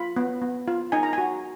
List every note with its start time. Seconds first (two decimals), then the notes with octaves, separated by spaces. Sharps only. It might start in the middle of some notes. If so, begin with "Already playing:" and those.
Already playing: F4 B5
0.16 B3
0.42 B3
0.68 F4
0.92 D#4 G#5
1.03 A#5
1.13 F#4 G#5